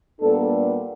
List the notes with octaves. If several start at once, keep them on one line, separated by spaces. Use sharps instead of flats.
A#2 G3 B3 D4 A4